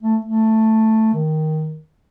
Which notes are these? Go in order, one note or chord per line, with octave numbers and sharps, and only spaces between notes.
A3
A3
D#3